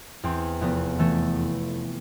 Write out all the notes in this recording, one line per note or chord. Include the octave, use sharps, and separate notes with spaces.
E2 C4
F1 B3
E3 A3